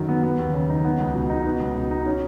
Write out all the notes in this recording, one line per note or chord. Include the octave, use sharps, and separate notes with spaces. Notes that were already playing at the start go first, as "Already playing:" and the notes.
Already playing: F#2 D#3 F#3
B3
B3
D#2
C#3
D#4
B3
C#2
B2
D#4
B3
C#2
B2
D#4
C#4